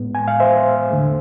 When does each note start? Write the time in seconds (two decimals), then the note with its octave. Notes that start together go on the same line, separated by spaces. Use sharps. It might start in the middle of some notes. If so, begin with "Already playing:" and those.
Already playing: A2 G#3 B3
0.15 G#5
0.28 F5
0.40 C5 E5
0.90 E2 D3 A3